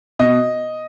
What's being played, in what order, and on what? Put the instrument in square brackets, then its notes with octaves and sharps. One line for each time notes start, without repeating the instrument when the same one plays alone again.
[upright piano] B2 D#5